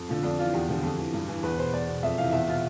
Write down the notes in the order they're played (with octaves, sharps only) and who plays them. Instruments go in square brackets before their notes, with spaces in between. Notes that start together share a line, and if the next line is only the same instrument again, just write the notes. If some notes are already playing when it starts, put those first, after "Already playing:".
Already playing: [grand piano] F2
D3 F3
F2 D4
E3 F4
E2 G4
D3 F3
F2
E3
G2
E3
E2 B4
B2 C5
E2 D5
B2
F2 E5
C3 E3 F5
E2 E5
B2 F4